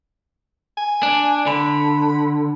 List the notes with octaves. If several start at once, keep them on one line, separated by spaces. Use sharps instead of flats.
G#5
D4
D3 B5